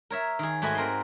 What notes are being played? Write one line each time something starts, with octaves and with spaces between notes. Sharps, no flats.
A#4 C#5 E5
D#3 G#4
G#2 A3 F#4 B4 D#5 G#5
C4 A#4 B4 C6